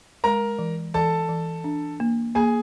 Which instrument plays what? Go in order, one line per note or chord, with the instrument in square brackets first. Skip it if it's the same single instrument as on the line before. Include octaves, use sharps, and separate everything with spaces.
[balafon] G#3 [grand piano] A#4 A#5
[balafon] E3
[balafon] E3 [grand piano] A4 A5
[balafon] E3
D4
A#3
[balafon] A#3 [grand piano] G#4 G#5